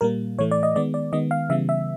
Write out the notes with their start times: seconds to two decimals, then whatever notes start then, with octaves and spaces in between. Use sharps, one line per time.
0.01 A#2 G3 A#3 A#4
0.38 A2 E3 A3 C#5
0.51 D5
0.63 D#5
0.76 D#3 G#3 B3 D5
0.94 D5
1.13 D#3 G#3 B3 D#5
1.31 F5
1.50 C#3 E3 G3 B3 E5
1.69 E5